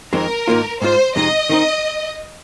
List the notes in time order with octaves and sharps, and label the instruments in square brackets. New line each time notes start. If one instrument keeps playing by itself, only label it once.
[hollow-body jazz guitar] F2 D#3 G#3 C4 [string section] A#4
[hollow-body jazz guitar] G#2 D#3 A#3 F4
[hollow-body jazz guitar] G#2 G#3 F4 [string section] C5
[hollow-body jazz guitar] F2 C3 G#3 D#4 [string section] D#5
[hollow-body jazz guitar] D#3 C4 D#4